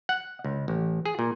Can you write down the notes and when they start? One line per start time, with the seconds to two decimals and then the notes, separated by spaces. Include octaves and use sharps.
0.09 F#5
0.44 C#2
0.68 A1
1.06 G#4
1.19 A#2